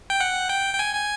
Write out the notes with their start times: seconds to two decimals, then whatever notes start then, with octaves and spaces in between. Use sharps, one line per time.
0.10 G5
0.21 F#5
0.50 G5
0.75 G5
0.79 G#5
0.95 G#5